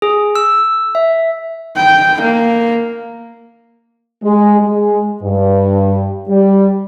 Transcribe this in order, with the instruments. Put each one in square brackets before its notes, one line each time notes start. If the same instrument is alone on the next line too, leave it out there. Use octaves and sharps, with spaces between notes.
[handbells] G#4
E6
E5
[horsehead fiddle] G5
A#3
[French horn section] G#3
G#3
G2
G3